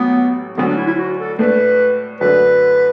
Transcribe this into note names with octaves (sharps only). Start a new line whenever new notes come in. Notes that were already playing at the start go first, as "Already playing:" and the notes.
Already playing: A1 A2 F#3 B3
D2 D3 F#3 B3
D4
E4
E4
F#4
A4
A2 A3 D4 B4
F#2 D3 F#3 A3 D4 B4